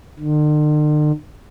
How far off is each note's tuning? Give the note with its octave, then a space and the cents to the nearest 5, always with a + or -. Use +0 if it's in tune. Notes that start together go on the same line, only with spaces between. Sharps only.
D3 +45